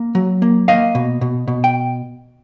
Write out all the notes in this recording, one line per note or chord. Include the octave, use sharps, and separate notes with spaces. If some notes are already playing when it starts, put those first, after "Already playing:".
Already playing: A#3
F#3
A#3
A#3 D#5 F5
B2
B2
B2
G5